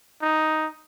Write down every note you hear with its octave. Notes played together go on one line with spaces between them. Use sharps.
D#4